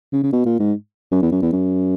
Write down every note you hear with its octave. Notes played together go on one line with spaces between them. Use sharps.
C#3
C#3
B2
A#2
G#2
F#2
E2
F#2
E2
F#2